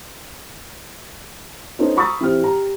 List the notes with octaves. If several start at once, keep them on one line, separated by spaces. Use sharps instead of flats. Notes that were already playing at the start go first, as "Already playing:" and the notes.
B3 C#4 D#4 A4 B4 C5
A#5 B5 C#6 D#6 E6 A6
E3 C4 G4 F6
G4 A#5